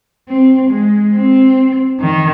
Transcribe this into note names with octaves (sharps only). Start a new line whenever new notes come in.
C4
G#3
C4
D#3